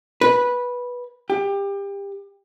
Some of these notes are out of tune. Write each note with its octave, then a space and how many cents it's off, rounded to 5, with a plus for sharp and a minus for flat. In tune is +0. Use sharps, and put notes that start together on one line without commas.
B4 -10
G4 +25